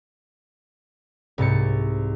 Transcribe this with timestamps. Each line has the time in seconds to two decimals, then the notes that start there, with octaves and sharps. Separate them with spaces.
1.38 C2 G#2 A6 C#7